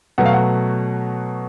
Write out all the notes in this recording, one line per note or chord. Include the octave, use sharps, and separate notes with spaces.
B2 F#3 A3 F#5
F5
F#5